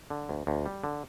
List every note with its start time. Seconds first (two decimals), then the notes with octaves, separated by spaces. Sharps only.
0.10 D3
0.29 D2
0.47 D2
0.66 G3
0.84 D3